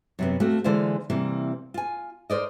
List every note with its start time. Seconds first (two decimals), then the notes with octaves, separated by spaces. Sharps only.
0.19 F#2 C3 B3
0.40 A3 A#3 C4 F#4
0.64 D3 E3 G#3 A#3 F4 C5
1.10 C3 E3 G3 A#3 C4
1.74 F4 G#5
2.30 A#4 C5 D5 D#5